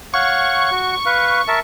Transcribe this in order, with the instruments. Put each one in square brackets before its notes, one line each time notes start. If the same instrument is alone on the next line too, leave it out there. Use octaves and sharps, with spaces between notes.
[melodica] C#5 F5 F#5 [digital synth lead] C#6
[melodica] F#4
B4 F5
A#4 E5 A5